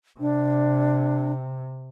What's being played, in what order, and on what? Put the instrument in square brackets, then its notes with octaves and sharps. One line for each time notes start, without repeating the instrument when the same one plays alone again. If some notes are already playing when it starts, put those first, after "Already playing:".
[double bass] C3 [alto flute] D4